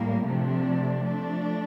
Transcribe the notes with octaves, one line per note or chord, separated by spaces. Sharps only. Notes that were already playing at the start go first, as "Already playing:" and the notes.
Already playing: A2 G3 A#3
C3 F3 A3 D4
F3 A3 D4